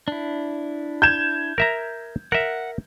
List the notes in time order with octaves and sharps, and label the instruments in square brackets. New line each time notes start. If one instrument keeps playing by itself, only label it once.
[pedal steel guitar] D4 E4
[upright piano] G6 G#6 E7
[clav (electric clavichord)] A#4 E5 A#5
[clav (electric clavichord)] A#4 E5 [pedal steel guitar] F#5